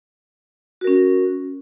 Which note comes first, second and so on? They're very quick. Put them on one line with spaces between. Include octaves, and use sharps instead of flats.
F#4 A#4 C#4